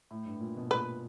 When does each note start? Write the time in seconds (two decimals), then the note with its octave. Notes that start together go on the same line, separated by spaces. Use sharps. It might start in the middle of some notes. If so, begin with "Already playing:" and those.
0.11 A2
0.25 G2
0.41 A#2
0.57 B2
0.71 A#2 B4